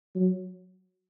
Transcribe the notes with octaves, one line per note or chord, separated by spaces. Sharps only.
F#3